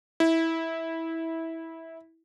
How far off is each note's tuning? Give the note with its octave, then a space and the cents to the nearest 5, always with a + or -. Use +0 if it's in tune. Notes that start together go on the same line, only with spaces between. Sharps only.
E4 -15